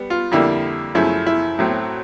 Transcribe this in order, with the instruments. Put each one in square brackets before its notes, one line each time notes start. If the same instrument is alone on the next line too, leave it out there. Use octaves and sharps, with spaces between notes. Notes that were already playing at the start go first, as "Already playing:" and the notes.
Already playing: [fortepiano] G3 B3
F4
F2 D3 G3 A#3 E4
F#2 C#3 F3 A3 E4
E4
A2 F#3 A3 C4